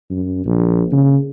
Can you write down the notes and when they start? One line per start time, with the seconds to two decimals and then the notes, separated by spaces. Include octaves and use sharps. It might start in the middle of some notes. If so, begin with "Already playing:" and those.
0.10 F#2
0.45 A#1
0.92 C#3